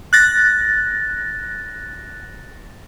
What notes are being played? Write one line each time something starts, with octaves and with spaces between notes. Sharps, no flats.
F#6 A6 A#6